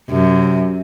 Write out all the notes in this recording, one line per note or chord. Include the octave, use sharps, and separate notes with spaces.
F#2 C3